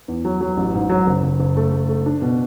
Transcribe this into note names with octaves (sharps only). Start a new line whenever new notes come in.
E2
F#3
F#3
A1
G#2
F#3
F#1
F#1
F#1
A3
A3
A3
D4
B2